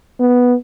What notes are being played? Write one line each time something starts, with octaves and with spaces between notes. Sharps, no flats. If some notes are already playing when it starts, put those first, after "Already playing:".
B3